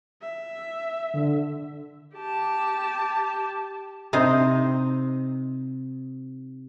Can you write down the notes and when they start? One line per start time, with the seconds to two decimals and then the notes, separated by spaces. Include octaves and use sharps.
0.21 E5
1.14 D3
2.16 G4 A5
4.13 C3 D#4 C5